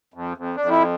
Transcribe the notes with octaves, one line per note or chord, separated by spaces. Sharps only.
F2
F2
F2 D4
E4